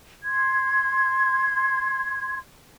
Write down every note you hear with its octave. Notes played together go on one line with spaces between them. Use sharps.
C6 G#6